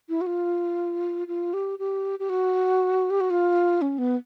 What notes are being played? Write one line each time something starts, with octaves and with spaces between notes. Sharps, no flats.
E4
F#4
F4
F4
G4
G4
G4
F#4
G4
F#4
F4
C#4
B3